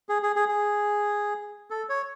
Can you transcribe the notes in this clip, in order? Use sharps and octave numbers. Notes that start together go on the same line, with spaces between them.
G#4
G#4
G#4
G#4
A4
C#5